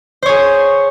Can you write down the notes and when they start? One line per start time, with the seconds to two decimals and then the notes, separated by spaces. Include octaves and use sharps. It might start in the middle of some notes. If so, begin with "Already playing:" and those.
0.22 C5
0.26 C#5
0.29 G#4